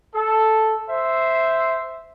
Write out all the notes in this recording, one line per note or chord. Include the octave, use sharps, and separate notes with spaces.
A4
C5 E5